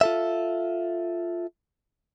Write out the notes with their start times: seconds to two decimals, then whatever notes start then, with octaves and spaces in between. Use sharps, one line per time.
0.01 F4 A4 E5